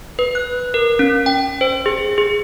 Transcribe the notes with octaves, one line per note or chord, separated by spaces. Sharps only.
B4
F#6
A#4
C#4
G5
C5
G#4
G#4